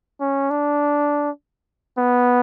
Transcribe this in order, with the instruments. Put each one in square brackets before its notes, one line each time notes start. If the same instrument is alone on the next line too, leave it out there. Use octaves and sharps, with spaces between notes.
[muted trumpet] C#4
D4
B3